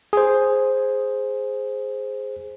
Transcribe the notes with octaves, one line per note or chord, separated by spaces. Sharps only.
G#4 C5